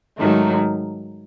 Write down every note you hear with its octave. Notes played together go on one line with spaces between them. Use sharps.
G#2 D#3 F#3 A3